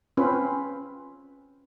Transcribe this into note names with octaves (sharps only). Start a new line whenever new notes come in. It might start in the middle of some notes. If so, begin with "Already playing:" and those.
C4 C#4 F4 B4